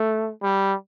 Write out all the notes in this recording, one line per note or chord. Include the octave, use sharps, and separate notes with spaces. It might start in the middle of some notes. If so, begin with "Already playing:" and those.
Already playing: A3
G3